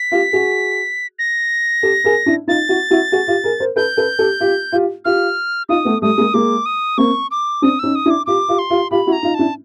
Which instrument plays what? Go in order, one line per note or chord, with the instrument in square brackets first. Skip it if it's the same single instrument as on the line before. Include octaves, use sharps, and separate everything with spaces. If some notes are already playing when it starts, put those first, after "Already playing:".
Already playing: [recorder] B6
[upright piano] F4 G4
F#4 G#4
[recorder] A#6
[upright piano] G4 A4
G#4 A#4
D4 E4
[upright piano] D#4 F4 [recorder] A6
[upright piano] E4 F#4
E4 F#4
F#4 G#4
F4 G4
G#4 A#4
A#4 C5
[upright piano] A4 B4 [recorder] G6
[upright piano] A4 B4
G4 A4
F4 G4
F4 G4
[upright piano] F4 G4 [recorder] F6
[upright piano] D#4 F4 [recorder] D#6
[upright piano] A3 B3
[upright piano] G3 A3 [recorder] D#6
[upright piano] G#3 A#3
[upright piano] G#3 A#3 [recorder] D6
[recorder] D#6
[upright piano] A#3 C4 [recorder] C#6
[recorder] D6
[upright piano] C4 D4 [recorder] D#6
[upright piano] C#4 D#4 [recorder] E6
[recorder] D#6
[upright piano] D4 E4
[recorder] D6
[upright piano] F4 G4 [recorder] D6
[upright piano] F4 G4
[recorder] C6
[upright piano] F4 G4
[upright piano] F4 G4 [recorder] B5
[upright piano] E4 F#4
[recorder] A#5
[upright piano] D#4 F4
[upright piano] D4 E4 [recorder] A5